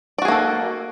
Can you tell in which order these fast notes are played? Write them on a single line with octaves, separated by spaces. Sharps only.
D5 F#4 G#4 A#3 A4